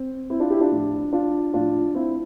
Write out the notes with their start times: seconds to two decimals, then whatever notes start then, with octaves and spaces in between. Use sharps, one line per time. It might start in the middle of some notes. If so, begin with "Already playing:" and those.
Already playing: C4
0.30 C4 E4
0.40 D4 F4
0.50 E4 G4
0.61 D4 F4
0.71 A2 F3
1.13 D4 F4
1.53 A2 F3 D4 F4
1.95 C4 E4